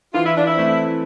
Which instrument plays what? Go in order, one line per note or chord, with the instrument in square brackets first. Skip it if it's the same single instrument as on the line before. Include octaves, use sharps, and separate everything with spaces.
[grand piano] E3 [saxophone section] F4
[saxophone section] E4
D4
E4
[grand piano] A3 C4